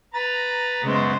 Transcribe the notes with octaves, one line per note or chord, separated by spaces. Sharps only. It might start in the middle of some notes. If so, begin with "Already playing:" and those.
B4 A#5 A6
F#2 C#3 G#3 B3 C5